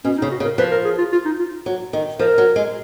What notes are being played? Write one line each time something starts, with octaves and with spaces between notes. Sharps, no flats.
B2 C#4
D#4
C#3
F#4
C#3
A#4
F3 B4
A#4
G#4
F4
F4
D#4
F4
F#3
D#3
F3 A#4
F#3
G#3